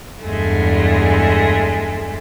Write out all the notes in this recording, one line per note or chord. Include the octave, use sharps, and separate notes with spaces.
E2 G2 G#3 A3